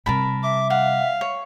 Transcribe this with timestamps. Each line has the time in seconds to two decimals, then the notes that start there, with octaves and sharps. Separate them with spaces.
0.06 C3 G3 A#4 A5 B5
0.43 E5 D6
0.70 F5 F#5
1.21 C#5